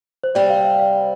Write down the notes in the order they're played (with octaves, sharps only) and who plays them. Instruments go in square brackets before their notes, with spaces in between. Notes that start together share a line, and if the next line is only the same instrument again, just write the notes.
[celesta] C5
[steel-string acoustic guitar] C3 G3 C4 [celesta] D5
[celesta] F5
F5
F5